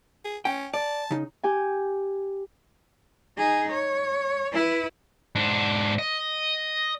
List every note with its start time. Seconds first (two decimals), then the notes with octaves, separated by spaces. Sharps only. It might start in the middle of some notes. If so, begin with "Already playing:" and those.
0.25 G#4
0.45 C#4 G5
0.74 D5 A5
1.11 C#3 D#4
1.43 G4 G5 G#5
3.37 D#4 G#4
3.71 C#5
4.53 E4 B4
5.35 G#2 D4
5.99 D#5